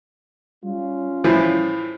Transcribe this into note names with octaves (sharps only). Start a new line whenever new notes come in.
G3 C#4 F4
A2 E3 F3